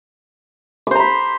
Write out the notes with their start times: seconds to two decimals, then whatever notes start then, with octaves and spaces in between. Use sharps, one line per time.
0.87 D6
0.91 C5
0.95 A#5
0.99 B5